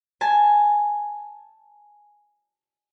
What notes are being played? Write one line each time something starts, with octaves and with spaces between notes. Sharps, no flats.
G#5 A5